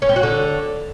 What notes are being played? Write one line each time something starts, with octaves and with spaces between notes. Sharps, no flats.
C#4
C4
F#4
D3